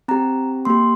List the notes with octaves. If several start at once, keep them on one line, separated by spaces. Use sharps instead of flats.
C4 G4 A#5
A#3 G4 C6